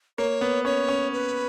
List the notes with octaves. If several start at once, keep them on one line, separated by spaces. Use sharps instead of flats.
A#3 C#5
B3
C#4 C#5
C#4
B4